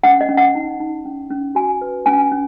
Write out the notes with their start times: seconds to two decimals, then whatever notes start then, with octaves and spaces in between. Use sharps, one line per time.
0.03 C#4 F#5
0.21 D#5
0.29 C#4
0.37 F#5
0.55 D#4
0.80 D#4
1.05 C#4
1.30 C#4
1.55 F#4 G#5
1.81 B4
2.06 C#4 G#5
2.32 C#4